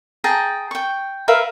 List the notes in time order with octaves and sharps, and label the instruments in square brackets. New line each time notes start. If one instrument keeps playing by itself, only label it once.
[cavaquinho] G#4 G5 A5 A#5
G5 C#6
A#4 B4 E5 F5